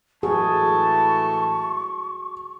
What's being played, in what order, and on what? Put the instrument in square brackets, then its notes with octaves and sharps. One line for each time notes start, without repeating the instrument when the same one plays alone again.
[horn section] A2 E3 A5 [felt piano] F#3 [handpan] G#4 [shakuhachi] C#6